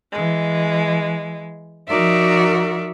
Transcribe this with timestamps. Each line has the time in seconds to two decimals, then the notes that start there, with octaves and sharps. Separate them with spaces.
0.12 E3 G#3
1.89 F3 D#4 F#4 A#4 D5 E5